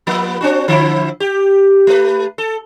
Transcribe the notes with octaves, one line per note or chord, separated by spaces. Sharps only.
F3 A#3 B3
C4 D4 F#4
D3 F3 E4
G4
A3 B4
A4